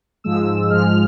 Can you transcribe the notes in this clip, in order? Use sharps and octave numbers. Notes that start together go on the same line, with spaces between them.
G#2 F3 G#3 E6
G#2 F3 G#3 F6